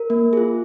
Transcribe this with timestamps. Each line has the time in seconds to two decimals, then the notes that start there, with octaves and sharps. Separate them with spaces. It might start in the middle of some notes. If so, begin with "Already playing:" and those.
Already playing: A#4
0.10 A#3
0.33 F4 G#4